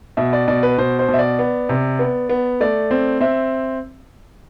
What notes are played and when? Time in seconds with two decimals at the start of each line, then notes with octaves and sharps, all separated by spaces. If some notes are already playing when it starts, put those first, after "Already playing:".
0.17 B2 E5
0.33 D5
0.48 B2 D5
0.63 B4
0.78 B2 C5
0.99 C5
1.08 B2
1.14 E5
1.19 D5
1.39 B3
1.69 C3
1.99 B3
2.29 B3
2.61 A3 D5
2.91 C4
3.21 C4 E5